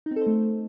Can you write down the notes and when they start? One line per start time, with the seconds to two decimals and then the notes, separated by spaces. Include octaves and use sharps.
0.06 D#4
0.11 C4
0.16 A4
0.21 C5
0.27 A3